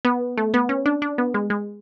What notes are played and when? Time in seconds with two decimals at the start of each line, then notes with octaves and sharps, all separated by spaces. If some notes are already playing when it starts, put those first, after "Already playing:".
0.05 B3
0.38 A3
0.54 B3
0.69 C#4
0.86 D4
1.02 D4
1.18 B3
1.34 G#3
1.50 G#3